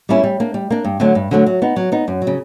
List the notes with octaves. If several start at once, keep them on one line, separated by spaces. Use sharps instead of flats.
G3 A#3 C#4 E4
G3
A#3 D4
G3
A#3 D4
G2
D3 F#3 A3 D4
G2
D3 F#3 A3 D4
F#3
B3 D#4
F#3
B3 D#4
F#2
F#3
C#3